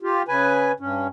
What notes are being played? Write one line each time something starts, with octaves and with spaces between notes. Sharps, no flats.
F4 G4
C#3 B4 G#5
G2 C#4